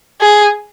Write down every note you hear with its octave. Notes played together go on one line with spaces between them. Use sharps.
G#4